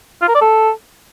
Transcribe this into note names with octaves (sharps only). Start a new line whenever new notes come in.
F4
A#4
D5
A4